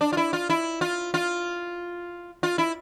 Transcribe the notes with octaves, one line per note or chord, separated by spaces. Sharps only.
D4
F4
E4
F4
E4
F4
F4
F4
E4